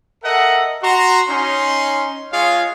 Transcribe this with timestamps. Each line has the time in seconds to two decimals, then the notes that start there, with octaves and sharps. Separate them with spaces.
0.24 A4 A#4 D#5 E5 F#5
0.83 F#4 A#5 C6
1.28 C#4 D#4 C6
2.32 G#3 F4 G#4 C#5 D#5 F5